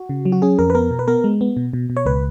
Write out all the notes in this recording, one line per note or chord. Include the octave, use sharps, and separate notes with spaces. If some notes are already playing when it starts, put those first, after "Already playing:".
Already playing: F#4
C#3
F#3
F#4
C#4 G#4
F2 A#4
B4
B3 A#4
B2
B4
B3 A#4
G#3
B3
B2
B2
B2
C#5
C#2 B4